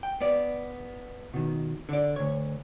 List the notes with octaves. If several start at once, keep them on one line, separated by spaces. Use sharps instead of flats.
G5
B3 D5
B2 D#3
D3 D5
D2 C#5